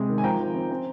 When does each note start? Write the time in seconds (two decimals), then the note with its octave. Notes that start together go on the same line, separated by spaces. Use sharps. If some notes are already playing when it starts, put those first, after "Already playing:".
Already playing: C3 G#3
0.09 D#3
0.18 G#5
0.24 F3 G5 A#5
0.39 F3
0.55 C4
0.71 C4